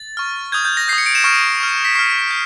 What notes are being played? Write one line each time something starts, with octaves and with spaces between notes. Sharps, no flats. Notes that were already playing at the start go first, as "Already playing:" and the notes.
Already playing: A6
C#6 F6
D#6 G6 G#6
G6
A#6
D#6 G6 C7
C#7
D7
E7
C#6 F6 D7
C#6 F6
B6
C#6 F6 C7
G6